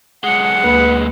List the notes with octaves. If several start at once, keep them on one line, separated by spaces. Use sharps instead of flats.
B1 G#3 F#5
D2 A#3 B4